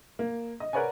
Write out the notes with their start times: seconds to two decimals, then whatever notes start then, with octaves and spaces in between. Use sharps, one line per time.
0.19 A#3
0.60 D#5
0.73 A#4 B4 C#5 D5 F#5 G#5